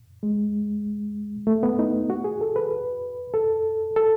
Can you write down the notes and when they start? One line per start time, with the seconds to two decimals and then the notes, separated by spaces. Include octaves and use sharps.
0.23 G#3
1.47 A3
1.63 B3
1.79 D#4
2.10 F#4
2.24 G#4
2.41 A4
2.56 B4
3.34 A4
3.96 A4